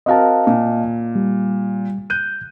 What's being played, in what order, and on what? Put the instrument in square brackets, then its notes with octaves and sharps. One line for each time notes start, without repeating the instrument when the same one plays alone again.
[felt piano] C4 F#4 A#4 [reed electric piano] D#5 F5 A5
[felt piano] A#2
[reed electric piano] G3
[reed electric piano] F#6 G6 [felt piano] D#7